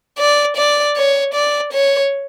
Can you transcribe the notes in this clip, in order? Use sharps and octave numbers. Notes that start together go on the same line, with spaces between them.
D5
D5
C#5
D5
C#5